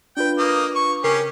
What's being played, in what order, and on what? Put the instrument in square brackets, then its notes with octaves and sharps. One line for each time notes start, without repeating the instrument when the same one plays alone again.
[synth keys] D4 F4 B4 [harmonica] G5
[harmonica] A#3 D#5
C#6
[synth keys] C#3 A#4 C7 [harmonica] C#4 G4